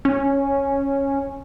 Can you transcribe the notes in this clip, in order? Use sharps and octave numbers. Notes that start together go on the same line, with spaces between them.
C#4